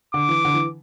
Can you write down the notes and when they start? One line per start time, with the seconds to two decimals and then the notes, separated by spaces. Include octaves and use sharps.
0.14 D3 D6
0.29 E3
0.45 D3
0.54 E3